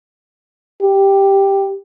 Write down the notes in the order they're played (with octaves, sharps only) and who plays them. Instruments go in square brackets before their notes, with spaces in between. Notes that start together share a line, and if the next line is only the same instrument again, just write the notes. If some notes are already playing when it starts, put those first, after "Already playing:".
[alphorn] G4